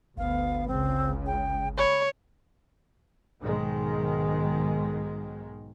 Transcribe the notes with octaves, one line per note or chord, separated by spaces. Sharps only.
G1 D2 B3 F5
C#2 C#3 C4
G5
C#5 B5
B1 G#2 D#3 G#3